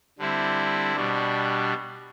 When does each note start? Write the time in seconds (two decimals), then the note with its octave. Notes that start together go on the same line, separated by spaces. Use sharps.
0.19 D3 G3 C4 E4
0.96 B2 G3 D4